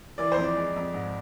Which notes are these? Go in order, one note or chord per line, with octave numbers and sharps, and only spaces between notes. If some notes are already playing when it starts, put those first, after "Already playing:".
E3 D5
C5
F2
D5
G#3
F2
G#2